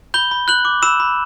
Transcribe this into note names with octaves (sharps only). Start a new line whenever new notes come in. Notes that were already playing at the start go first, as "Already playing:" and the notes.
B5 G6 G7
B5
F#6 G6 F#7
D6
B5 E6 E7
B5